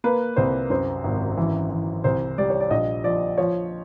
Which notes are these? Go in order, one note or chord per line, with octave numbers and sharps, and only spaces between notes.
A#3 B4
C2 C5
F#2 C5
G#1
E3
E3
C2 C5
G3 D5
C#5
D5
A#1 D#5
F3 D5
F3 C#5